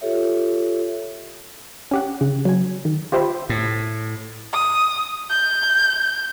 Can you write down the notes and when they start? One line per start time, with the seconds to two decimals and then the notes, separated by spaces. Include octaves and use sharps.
0.01 F4 G4 A4 C#5 E5
1.91 C#4 G4 F#5
2.21 C#3
2.45 F#3 G#5
2.85 D#3
3.12 F4 G4 C5 E5 G5 B5
3.50 A2
4.54 D#6
5.31 G6